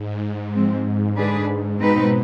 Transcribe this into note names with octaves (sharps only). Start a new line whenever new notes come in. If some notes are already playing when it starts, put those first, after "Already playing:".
Already playing: G#2
F3 G#3 C4
G#2
G#2 D3 G#3 D4 G#4 B4
B2 G#3 C4 D#4 B4